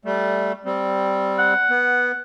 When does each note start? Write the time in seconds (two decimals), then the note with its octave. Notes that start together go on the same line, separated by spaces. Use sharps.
0.05 G3 A3
0.65 G3 C4
1.39 F#5
1.69 B3